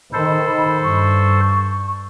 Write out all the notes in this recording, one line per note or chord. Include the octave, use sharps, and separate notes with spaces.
D#3 A4 C5 B5
G2 C#6